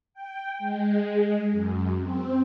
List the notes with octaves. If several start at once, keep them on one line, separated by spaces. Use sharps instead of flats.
G5
G#3
F#2
C4